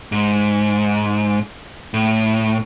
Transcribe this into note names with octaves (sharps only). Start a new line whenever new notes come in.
G#2
A2